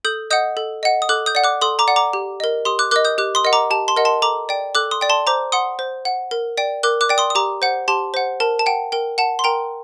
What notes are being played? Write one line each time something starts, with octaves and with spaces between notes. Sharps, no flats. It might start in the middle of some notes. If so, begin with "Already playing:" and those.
A4 D#6 G6
D#5 F#5 D#6 G6
A4
D#5 F#5
D#6
A4 D6 F#6
D#6 G6
D5 F#5
D6 F#6
A4 C6 D#6
A#5 D6
D5 F#5
A#5 D6
G4
A#4 D#5
G4 C6 D#6
D6 F#6
A#4 D#5 D6 F#6
D#6 G6
G4 D6 F#6
C6 D#6
A#4 D#5 F#5
A#5 D6
G4 A5
A5 C6
A#4 D#5 F#5
A5 C6
A4 A#5 D6
D5 G5
A4 D6 F#6
C6 D#6
D5 G5
A5 C6
C5 A#5 D6
F#5 C6 D#6
C5
F#5
A#4
D5 G5
A#4 D6 F#6
D6 F#6
D5 G5
C6 D#6
D#6
G4 A#5 D6
C5 F#5
G4 A5 C6
C5 F#5
A#4 A5
A5
F#5 G5
A#4 G5
F#5 A5
C6
A#4 G5 A#5